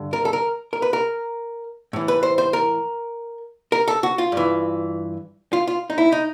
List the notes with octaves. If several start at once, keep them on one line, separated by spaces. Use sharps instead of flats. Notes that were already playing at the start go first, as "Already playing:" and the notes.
Already playing: G2 D3
A#4
A4
A#4
A#4
B4
A#4
A2 E3
B4
C5
C5
A#4
A#4
A4
F#4
F4
G2 E3
F4
F4
D#4
E4
D#4